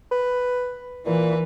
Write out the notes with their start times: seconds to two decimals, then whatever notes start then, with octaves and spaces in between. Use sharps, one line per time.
0.12 B4
1.06 A#2 E3 B4